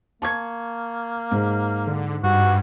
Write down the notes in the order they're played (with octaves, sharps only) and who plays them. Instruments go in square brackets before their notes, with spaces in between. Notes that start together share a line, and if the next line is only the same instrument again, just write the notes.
[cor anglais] A#3 [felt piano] A5 C#6 G#6
[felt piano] G#2
[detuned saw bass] D3
[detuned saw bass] G2 [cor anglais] F#4